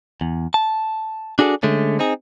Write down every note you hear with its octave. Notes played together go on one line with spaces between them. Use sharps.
E2
A5
D4 F#4 G#4 A4 D5
D3 G#3 A3 C#4
C4 D#4 G#4